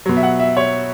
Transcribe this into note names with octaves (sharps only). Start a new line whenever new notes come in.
B2 F#3
E5
F#5
E5
C#5